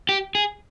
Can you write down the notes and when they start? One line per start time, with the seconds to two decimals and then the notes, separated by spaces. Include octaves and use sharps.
0.09 G4
0.35 G#4